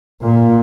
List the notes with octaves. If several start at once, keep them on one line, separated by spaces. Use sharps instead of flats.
A#2